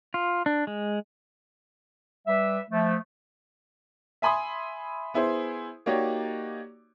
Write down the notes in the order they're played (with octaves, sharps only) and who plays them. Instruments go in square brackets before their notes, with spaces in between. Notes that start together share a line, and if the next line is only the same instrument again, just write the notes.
[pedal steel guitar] F4
D4
G#3
[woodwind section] G3 B4 E5
F3 A3
[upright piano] E5 G#5 B5 C6 D#6
B3 E4 G#4 C5
A#3 D#4 F#4 G4 C#5 D5